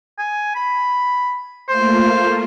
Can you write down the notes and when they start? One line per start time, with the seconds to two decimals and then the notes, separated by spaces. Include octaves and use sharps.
0.18 G#5
0.55 B5
1.69 A3 A#3 F4 C5